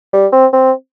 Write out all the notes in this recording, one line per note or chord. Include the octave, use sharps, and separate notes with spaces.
G3
C4
C4